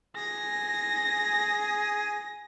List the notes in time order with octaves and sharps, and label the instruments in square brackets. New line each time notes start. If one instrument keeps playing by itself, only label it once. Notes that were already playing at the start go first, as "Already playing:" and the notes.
[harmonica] G#4 [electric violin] A#6